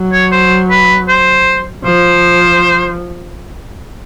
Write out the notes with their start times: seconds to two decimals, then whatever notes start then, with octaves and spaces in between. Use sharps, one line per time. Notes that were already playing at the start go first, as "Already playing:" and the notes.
Already playing: F#3
0.12 C#5
0.32 C5
0.70 B4
1.08 C5
1.85 F3 C5